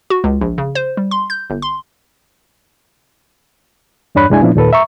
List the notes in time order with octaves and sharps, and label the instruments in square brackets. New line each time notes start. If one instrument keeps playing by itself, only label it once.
[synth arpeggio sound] F#4
C#2
A#1
C#3
C5
G3
C6
G6
G1
C6
[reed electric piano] E2 G2 D4 C#5 B5 F#6
C2 F#2 G#3 D4 E4 G#5
A#2 F3 B3 C#4 D4 E4
D#2 A#2 A4 B4
E5 A#5 C#6